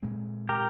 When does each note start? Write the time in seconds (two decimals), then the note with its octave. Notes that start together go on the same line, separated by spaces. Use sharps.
0.02 A#2 G#3 C4
0.49 G4 A#4